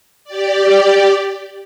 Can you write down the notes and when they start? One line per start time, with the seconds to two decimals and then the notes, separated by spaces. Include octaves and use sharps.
0.24 G4 D5